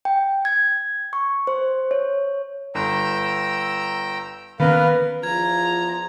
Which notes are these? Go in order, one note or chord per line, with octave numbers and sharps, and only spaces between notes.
G5
G#6
C#6
C5
C#5
G1 G5 A#5 E6
D#3 A#3 B3 C#4 A#4 B4
E2 F3 F4 A#5 G#6